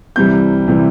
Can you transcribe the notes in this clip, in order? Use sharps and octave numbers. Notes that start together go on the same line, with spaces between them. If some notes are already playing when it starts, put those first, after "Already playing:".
C2 C3 E3 G3 G6
C3 E3 G3